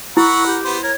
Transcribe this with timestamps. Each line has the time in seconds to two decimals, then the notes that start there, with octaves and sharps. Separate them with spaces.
0.17 E4 A#4 F#5 B5 C#6 E6
0.46 G4
0.65 B3 C5
0.83 A#4 C#5 G#6